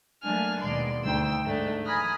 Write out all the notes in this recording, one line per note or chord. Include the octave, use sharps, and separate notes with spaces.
F#3 A3 A#3 D4 G#5 F6
D#2 B2 G#3 D5 C6
D2 D#4 G5 E6
G#2 A3 D4
G#5 A#5 B5 D#6 F6 F#6